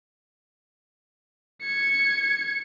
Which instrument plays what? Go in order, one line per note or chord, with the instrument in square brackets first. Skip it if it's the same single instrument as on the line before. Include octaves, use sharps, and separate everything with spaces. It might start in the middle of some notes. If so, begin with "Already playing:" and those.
[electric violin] G#6 C#7